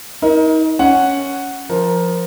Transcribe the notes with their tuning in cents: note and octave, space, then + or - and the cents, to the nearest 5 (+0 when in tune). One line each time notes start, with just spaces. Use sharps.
D#4 +35 A#4 +25
C#4 +0 F#5 +0
F3 +0 A#4 +15